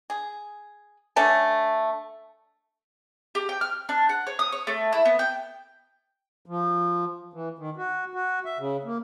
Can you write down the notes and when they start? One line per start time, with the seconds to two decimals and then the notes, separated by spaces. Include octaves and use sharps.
0.10 G#4
1.16 D3 A3 C#4
3.35 G4
3.49 G5
3.61 F6
3.89 D4
4.09 F#5
4.27 C#5
4.39 D#6
4.52 C#5
4.67 A3
4.93 E4
5.05 B3
5.19 G5
6.46 F3
7.34 E3
7.59 D#3
7.77 F#4
8.14 F#4
8.45 E5
8.59 C#3
8.85 A#3